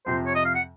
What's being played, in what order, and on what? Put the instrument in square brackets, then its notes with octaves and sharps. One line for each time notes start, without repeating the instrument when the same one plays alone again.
[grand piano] F2 C3 F3 [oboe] C5
[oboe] C#5
D#5
F5
F#5